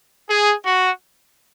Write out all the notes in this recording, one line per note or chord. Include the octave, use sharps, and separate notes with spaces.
G#4
F#4